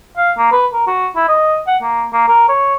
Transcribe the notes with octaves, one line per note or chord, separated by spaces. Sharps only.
F5
A#3
B4
A#4
F#4
E4
D#5
F#5
A#3
A#3
A#4
C#5